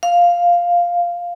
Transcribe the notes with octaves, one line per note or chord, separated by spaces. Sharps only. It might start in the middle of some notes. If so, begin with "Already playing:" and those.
F5